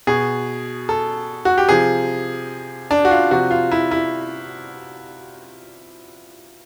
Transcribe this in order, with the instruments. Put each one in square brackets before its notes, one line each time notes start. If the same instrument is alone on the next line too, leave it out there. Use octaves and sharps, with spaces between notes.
[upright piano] B2 G#4
A4
F#4
G4
C3 F3 G#4
D4
F#4
F4
C3 F3 F#4
F4
E4
E4